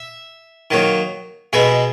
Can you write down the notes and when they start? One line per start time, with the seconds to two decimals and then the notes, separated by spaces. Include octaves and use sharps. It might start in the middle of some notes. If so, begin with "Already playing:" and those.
Already playing: E5
0.71 D#3 F#3 A#3
1.53 B2 G#3 B3 E5